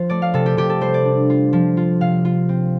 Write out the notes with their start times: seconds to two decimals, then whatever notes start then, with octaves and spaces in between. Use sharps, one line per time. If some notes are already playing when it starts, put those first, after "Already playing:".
Already playing: F3 F4 C5
0.10 A3 D5
0.22 F5
0.34 C3 A4
0.46 G4
0.57 C3 G4
0.70 A4
0.81 G3 C5
0.94 D5
1.05 D4
1.30 F4
1.53 F3
1.77 F4
2.01 C3 F5
2.25 F4
2.49 C4